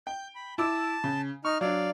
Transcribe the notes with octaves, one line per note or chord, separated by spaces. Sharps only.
G5 G6
B5
E4 A5 D6 E6
C#3
D#4 C#6 F6
F#3 D4 D5 F5